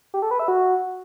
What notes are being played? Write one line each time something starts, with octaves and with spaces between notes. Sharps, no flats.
G4
A4
B4
E5
F#4